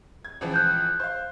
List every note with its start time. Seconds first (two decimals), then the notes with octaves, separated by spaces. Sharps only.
0.25 G#6
0.41 C#2 E3 F3
0.54 F#6 G6
1.00 C5 F5